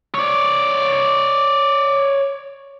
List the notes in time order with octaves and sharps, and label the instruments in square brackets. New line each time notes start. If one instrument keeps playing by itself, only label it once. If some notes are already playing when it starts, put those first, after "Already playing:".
[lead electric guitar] C#5 D5